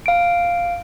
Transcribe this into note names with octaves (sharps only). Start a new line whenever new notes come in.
F5 D7